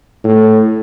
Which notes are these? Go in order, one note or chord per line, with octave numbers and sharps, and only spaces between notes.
A2